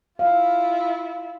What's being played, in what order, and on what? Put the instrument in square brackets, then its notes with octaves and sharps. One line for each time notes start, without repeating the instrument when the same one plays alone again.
[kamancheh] E4 F4 [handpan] F5